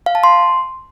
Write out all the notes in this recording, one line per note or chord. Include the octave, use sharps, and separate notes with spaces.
F5
A5
C6